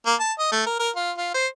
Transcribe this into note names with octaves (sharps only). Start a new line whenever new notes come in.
A#3
A5
D#5
A3
A#4
A#4
F4
F4
C5